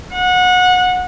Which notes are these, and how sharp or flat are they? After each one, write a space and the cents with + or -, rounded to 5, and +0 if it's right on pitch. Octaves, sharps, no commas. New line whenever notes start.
F#5 -25